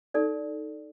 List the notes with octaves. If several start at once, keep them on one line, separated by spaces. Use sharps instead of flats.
D#4 A4 D5